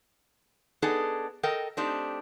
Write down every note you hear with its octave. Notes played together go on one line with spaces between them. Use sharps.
B3 D4 D#4 G#4 A4
A4 A#4 D#5 G5
A3 C4 D4 D#4 G4